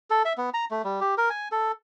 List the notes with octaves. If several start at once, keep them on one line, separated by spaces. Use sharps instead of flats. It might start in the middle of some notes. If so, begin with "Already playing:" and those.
A4
E5
B3
A#5
A3
G3
G4
A#4
G#5
A4